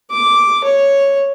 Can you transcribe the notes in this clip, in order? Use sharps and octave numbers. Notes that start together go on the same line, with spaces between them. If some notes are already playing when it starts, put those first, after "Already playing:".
D6
C#5